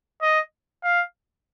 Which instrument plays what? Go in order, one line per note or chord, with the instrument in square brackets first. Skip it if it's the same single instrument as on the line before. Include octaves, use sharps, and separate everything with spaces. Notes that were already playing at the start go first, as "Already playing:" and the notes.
[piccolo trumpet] D#5
F5